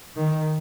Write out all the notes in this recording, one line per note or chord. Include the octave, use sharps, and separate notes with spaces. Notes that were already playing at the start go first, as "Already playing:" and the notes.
D#3